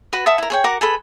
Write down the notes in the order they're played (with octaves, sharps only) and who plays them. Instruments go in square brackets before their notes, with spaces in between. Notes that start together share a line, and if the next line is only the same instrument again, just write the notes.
[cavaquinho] F#4 B4
E5 F#5 A5 D#6
E4 A#4
G#4 C#5 G5
F#4 A#4 F#5 D6
G#4 A4 B4 B5